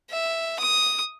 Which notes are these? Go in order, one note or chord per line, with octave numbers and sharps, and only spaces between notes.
E5
D#6